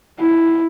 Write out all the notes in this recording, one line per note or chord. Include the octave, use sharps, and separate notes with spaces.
E4